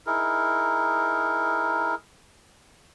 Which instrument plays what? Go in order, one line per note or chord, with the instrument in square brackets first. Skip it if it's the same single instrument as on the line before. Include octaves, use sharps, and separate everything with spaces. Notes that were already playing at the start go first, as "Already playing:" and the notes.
[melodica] D#4 E4 G#4 A#4